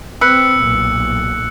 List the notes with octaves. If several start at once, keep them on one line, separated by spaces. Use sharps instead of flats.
C4 B4 E6 F#6 C#7
B1 A#2